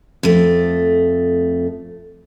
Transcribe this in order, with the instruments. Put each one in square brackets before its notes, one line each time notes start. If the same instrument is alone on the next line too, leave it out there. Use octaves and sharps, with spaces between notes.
[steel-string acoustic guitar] F2 A3